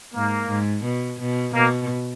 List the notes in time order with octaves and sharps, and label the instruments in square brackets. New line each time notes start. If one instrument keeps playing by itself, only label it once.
[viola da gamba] G#2 [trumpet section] A#3
[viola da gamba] G#2
B2
B2
[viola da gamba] B2 [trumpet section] A#3